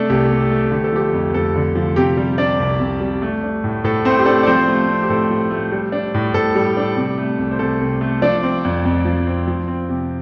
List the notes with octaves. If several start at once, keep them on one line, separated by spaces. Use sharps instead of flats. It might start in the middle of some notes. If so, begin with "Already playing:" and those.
Already playing: C3 A3 D4 A4
C2 G4
C3
A3
D3 G4
A4
F3 G4
F2
F2 A4
D3
F3
C3 G4
G3
D4 D5
C2
C3
G3
A3
D4
A2
A2 A4
A3 C4 C5
G4
D4 A4
D5
F3 C4 C5
A3
C4
G4
A2 A4
F3
A3
G3
D4
A2
A2 A4
G3
D4
C3
A3
C2
C5
C2 A4
C3
A3
F3 D4 D5
C4
F2
F2
F3
C4
F3
C4
C3